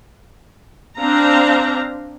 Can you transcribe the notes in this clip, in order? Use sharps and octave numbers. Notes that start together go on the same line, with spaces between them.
C4 D4 F5 A#5